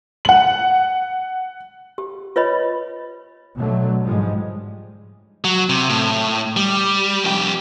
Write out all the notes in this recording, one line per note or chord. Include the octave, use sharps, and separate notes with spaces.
F#5 F#7
G4
F4 B4 C#5 D#5 B5
B2 D3 F#3 A3
G#2 F3 G3 G#3
F#3
C3
A2
G3
F2 G4